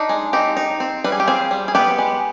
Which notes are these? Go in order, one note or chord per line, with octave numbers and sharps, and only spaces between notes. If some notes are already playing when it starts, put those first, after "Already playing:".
Already playing: D4 D#4
G#3
C4 D#4 G4
D#4
C4
G3 B4
G#4
G4
C4 F4 G#4
G3
G#4
B3 G4 B4
G#3